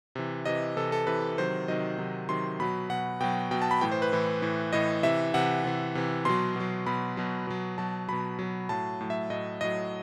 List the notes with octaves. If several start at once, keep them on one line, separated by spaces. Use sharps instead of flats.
C3 E3
C3 E3 D#5
C3 E3 A4
A4
C3 E3 B4
C3 D#3 F#3 C5
C3 D#3 F#3 D#5
C3 D#3 F#3
C3 D#3 F#3 C6
B2 F#3 B5
B2 F#3 F#5
B2 F#3 G5
B2 F#3 G5
A5
B5
A2 E3 G5
C5
B4
A2 E3
A2 E3
A2 E3 D#5
C3 E3 E5
C3 E3 F#5
C3 E3
C3 E3
B2 F#3 C6
B2 F#3
B2 F#3 B5
B2 F#3
B2 F#3
B2 F#3 A5
B2 F#3 B5
B2 F#3
A2 F#3 A5
A2 F#3
E5
A2 F#3 D#5
A2 F#3 D#5